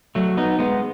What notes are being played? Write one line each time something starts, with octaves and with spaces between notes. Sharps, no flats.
F#3 A3
B3 D#4
G#3 B3